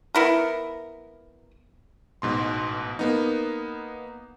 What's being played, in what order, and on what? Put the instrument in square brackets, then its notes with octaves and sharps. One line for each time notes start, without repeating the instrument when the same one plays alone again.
[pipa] B3 E4 A#4
[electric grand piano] A1 G#2 B2 C6
A#3 B3 D#4